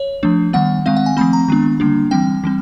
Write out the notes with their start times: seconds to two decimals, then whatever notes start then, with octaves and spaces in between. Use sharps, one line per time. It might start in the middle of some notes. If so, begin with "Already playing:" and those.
Already playing: C#5
0.23 F3 A3 D4
0.53 D#3 G3 B3 F#5
0.86 D#3 G#3 C4 F5
0.97 F#5
1.06 G#5
1.17 F3 A3 C4 B5
1.33 A#5
1.48 D#3 G#3 B3 D4
1.80 D3 G3 A#3 D4
2.11 E3 G3 C4 G5
2.44 E3 G3 C4